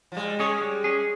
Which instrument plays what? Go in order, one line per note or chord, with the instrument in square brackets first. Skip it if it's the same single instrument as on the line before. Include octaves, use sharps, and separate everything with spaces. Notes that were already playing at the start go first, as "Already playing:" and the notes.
[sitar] F3
[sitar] G3 [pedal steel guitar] G#3
[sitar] G#3 [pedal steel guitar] C#4 G#4 C#5
[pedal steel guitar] G3
C#4 G#4